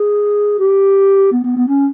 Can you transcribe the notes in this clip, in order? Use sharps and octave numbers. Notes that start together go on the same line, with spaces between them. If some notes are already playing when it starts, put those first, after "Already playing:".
Already playing: G#4
G4
B3
B3
B3
C#4